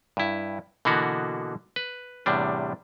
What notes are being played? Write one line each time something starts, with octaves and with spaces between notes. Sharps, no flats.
G2 E4
B2 D3 E3 A#3 B3 F#4
B4
E2 A2 C3 G3 D4